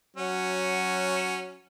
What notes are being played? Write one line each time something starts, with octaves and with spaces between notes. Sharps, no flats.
F#3 C#4 F#4